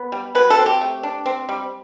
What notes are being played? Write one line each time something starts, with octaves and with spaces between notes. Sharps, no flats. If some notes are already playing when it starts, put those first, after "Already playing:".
Already playing: B3
G3
F#3 B4
A4
C4
G4
A3
D4
C4
G3